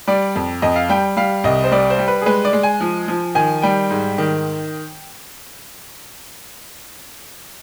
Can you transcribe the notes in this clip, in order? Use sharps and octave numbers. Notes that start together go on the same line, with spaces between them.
G3 D5
F2
F2 D#5
F5
G3 G5
G3 F5
C2 D#5
C5
G3 D5
C5
G3
B4
G#4
G#3 B4
D5
G#3
G#5
F3
F3
D#3 G#5
G3 G5
G#2
D#3